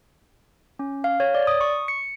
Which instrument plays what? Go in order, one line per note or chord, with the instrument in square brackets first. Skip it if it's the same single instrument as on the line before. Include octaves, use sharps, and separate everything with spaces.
[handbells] C#4
F5
C#5
D5
D#6
C#6
C#7